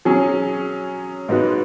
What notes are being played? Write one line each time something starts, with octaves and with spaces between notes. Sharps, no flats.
F#3 C#4 G#4
G#2 G#3 B3 F#4